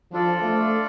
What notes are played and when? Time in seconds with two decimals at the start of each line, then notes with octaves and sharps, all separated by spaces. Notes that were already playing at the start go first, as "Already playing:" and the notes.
0.12 F3 D4 F4 A4 D5
0.42 A3